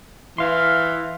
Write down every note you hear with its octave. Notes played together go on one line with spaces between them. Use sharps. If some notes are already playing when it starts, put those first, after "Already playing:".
E3 F5 C6